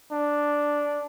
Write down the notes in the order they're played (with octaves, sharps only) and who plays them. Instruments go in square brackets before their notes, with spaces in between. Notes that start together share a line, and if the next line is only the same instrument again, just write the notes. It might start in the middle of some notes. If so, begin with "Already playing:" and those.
[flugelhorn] D4